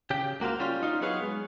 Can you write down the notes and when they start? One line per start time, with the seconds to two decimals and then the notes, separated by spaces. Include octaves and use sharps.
0.10 C#3 G4 G5
0.40 C#2 A#3 F#4 C5 F5
0.60 G3 C#4 F4
0.83 D#4 F4
1.01 F#3 B3 G#4 B4 C#5 F5
1.22 G#3